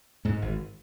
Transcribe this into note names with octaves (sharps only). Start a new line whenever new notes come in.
G#2 G#3
G#1